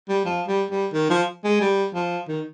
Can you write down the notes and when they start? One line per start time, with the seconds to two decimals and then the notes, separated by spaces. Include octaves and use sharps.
0.09 G3
0.25 F3
0.48 G3
0.71 G3
0.93 D#3
1.10 F3
1.44 G#3
1.61 G3
1.94 F3
2.28 D#3